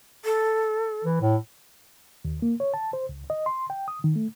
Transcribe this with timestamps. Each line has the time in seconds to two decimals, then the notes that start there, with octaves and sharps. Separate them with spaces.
0.25 A4
1.05 E3
1.21 A2
2.25 D#2
2.42 A#3
2.60 C#5
2.74 A5
2.93 C5
3.09 C#2
3.30 D#5
3.46 C6
3.70 G5
3.88 D#6
4.04 D#3
4.16 A3